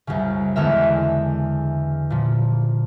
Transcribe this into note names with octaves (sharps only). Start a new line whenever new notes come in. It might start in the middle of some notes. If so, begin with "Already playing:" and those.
C2 F#2 C#3
E2 D3 G#3 A#4 E5
A#2 F3